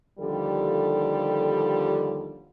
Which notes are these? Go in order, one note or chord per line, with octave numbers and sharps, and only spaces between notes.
D#2 D3 F3 G3 G4 A4